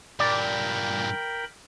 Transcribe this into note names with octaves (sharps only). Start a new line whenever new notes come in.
G2 A#2 A#4 D5 G5 B5